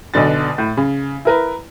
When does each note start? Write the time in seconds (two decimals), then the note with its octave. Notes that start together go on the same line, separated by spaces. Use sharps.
0.14 B1 B2 D3 A6
0.58 A2
0.77 C#3
1.25 E4 A#4 B4